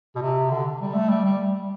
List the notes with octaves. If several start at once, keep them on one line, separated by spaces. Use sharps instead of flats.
B2
C3
D3
G3
A3
G3
G3